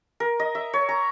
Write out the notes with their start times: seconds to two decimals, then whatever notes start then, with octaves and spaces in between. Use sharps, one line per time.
0.20 A#4
0.39 D#5
0.55 E5
0.73 C#5
0.89 A#5